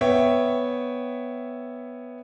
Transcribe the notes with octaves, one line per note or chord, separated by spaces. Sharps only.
B3 C#5 E5 G5